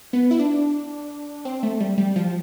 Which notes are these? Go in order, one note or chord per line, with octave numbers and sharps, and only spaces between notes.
B3
E4
D4
C4
A3
G3
G3
F3